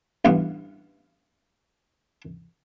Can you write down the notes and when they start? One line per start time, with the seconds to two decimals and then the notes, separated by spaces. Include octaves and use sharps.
0.25 A1 G2 B3 F5